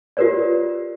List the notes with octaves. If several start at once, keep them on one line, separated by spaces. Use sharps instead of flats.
F4 G4 A#4 B4 C#5 D5